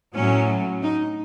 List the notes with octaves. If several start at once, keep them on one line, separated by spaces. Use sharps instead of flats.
A2 F#3 C#4
D#4